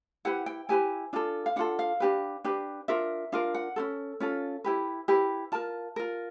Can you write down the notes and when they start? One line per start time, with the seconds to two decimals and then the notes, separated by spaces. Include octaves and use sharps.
0.25 E4 G4 B4 F#5
0.46 G5
0.69 E4 G4 B4 G#5
1.13 D4 F4 A4
1.46 F5
1.56 D4 F4 A4 F#5
1.79 F5
2.00 D4 G4 B4
2.44 D4 G4 B4
2.88 D4 F4 A#4 E5
3.32 D4 F4 A#4 F5
3.55 F#5
3.76 C#4 F4 A4
4.20 C#4 F4 A4
4.64 E4 G4 B4
5.08 E4 G4 B4
5.52 F4 A#4 A5
5.96 F4 A#4